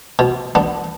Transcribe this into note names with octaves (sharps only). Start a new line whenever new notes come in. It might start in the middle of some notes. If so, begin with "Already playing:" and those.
B2
B3 D4